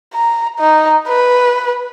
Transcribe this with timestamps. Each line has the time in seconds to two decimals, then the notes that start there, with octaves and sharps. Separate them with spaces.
0.14 A#5
0.59 D#4
1.08 B4